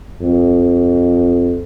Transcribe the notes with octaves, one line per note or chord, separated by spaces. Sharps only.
F2